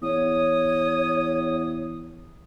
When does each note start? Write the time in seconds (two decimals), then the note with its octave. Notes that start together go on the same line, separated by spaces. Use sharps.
0.02 E2 C#5 D#6